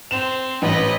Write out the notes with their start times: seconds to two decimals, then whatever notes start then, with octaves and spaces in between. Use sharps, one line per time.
0.11 C4 E7
0.62 A1 B4 D#5